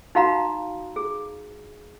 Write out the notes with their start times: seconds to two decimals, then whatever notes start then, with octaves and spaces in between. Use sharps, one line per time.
0.15 D#4 F#4 F5 A#5 B5
0.96 G#4